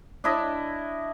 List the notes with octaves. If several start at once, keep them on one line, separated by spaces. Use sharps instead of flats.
D4 E4 D#5